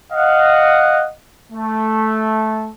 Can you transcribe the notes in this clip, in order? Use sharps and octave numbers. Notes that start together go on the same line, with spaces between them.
D#5 F5 F#5
A3